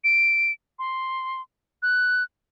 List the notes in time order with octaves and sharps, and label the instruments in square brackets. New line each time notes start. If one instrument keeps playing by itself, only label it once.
[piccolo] D7
C6
F#6